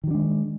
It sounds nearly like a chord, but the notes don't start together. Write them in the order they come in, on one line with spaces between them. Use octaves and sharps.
D#3 F#3 D4 G#3